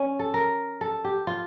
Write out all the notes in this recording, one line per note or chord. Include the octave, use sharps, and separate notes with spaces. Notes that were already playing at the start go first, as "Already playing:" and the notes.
Already playing: C#4
A4
A#4
A4
G4
F4